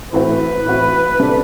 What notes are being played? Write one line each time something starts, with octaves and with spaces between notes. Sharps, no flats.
A2 E3 A3 C4 F#4 B4
A2 E3 A3 C4 F#4
C3 G3 D4 A4